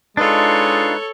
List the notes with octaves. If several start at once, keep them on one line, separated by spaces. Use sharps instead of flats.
G#3 D4 D#4 F4 A4 B4 C#5